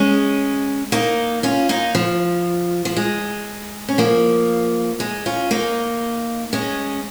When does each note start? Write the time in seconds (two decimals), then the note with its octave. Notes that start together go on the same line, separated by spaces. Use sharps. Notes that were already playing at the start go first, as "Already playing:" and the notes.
Already playing: G#3 C#4
0.92 A#3 D#4
1.43 C#4 F4
1.69 A#3 D#4
1.95 F3
2.85 F3
2.96 G#3
3.88 C#4
3.98 F3 A#3
5.00 G#3
5.26 C#4 F4
5.51 A#3 D#4
6.53 G#3 C#4